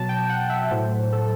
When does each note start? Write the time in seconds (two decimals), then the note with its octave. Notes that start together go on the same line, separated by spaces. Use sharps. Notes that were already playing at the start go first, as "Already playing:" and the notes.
Already playing: B2 F#3 A5
0.09 G5
0.29 F#5
0.49 E5
0.71 A2 F#3 C5
1.12 A4